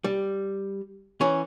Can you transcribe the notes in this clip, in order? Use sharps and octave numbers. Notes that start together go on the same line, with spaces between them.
G3
E3 C#4